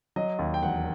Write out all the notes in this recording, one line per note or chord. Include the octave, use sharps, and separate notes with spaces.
F#3 D#5
D#2
G5
E1 F#5